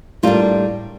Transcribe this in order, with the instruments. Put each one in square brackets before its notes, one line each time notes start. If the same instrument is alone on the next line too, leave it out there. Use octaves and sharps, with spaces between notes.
[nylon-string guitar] A2 G3 A#3 D4 F4